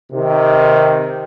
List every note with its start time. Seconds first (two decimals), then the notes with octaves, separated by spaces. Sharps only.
0.12 C3 D#3